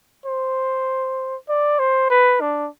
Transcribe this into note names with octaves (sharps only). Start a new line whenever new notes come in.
C5
D5
C5
B4
D4